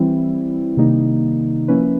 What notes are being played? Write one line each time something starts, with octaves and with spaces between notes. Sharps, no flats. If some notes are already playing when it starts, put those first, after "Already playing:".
Already playing: E3 G3 C4 E4
C3 D#3 G3 A#3 D#4
F3 A#3 C#4 E4 B4